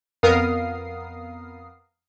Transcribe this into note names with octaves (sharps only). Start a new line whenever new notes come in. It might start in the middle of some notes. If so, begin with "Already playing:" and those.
F2 B3 A#4 F5 D#6 C7